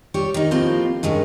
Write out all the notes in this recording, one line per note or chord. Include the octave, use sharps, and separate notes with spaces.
G3 G4 C#5
D#3 D#4
A2 F3 A#3 C4 F4 G4
G2 D#3 G#3 C#4